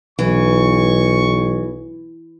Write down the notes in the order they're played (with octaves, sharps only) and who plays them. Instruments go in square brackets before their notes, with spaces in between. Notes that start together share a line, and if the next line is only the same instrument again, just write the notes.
[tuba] B1 [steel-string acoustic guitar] E3 [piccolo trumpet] C#6